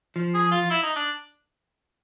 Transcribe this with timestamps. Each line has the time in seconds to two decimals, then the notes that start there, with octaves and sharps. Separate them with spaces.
0.16 F3
0.35 G#4
0.51 F4
0.70 E4
0.83 D#4
0.96 D4